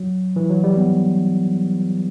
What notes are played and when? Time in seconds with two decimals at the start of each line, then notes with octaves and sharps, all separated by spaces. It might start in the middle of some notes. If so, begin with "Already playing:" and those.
Already playing: F#3
0.36 E3
0.50 F#3
0.64 G3
0.77 B3